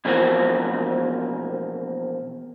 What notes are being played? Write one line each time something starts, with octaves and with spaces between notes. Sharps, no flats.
B2 E3 F3 A#3 C4 F#4